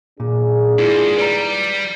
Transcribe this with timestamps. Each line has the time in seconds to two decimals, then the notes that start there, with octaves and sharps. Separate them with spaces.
0.20 D#2 A#2 D4 G#4
0.79 G#2 E4 F4
1.17 G3 B4 D5 A#5